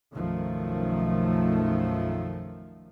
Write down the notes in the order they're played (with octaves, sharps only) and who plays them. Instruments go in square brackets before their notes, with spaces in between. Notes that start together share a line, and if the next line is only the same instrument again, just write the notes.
[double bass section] B1 F#2 D#3 F3 A3